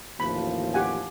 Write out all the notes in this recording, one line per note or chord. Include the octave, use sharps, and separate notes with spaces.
A1 D#2 F3 B5
G4 F#5 G#5